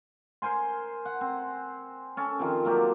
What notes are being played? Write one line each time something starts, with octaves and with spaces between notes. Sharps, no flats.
A#4 C5 G#5 C6
F#5
C4
C#4 A4
D#3 F3 C4 G4
F#3 A#3 D4 G4